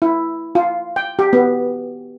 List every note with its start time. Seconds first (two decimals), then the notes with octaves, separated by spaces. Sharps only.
0.02 E4
0.55 F4
0.96 G5
1.19 G4
1.33 B3